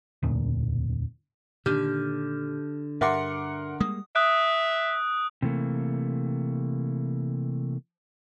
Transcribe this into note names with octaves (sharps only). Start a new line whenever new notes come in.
E1 D2 A#2
A#2 D3 D#3 G4 F6 G6
G2 A#4 E5 F#5 C6 D6 C#7
G3 G#3 A#3 D#6
E5 D#6 F#6 D7
C3 E3 A3 A#3